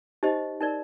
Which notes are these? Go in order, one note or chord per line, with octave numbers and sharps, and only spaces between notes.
D#4 G4 C5 D#5
D#4 A#4 D5